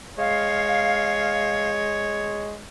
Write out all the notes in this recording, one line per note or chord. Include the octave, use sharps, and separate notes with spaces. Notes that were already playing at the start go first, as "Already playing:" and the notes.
G#3 C#5 F5